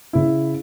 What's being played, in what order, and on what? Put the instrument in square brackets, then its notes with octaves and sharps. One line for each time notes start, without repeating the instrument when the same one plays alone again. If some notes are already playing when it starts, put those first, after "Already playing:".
[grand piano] C#3 E4